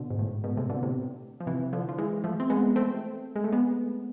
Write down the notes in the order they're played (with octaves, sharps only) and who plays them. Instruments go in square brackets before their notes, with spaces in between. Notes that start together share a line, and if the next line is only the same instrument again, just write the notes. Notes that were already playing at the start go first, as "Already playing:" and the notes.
Already playing: [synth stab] B2 D3
G#2
A2
G#2 B2
A2 C3
B2 D3
A2 C3
F3
C3 E3
D3 F3
F3
E3 G#3
F3 A3
C4
G#3 B3
A3 C4
G#3
A3
G#3 B3